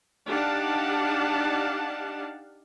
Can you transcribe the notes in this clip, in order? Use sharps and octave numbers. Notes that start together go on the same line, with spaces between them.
D4 D#4 G4 F5 F#5 A5